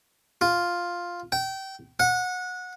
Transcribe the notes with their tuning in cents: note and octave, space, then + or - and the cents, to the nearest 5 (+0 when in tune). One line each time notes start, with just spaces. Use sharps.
F4 +5
G5 -25
F#5 -25